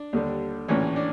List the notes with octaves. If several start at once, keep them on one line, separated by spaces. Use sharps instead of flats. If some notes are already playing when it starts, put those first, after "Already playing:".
Already playing: D4
D#2 D3 G3
A#1 A2 E3 C#4
D4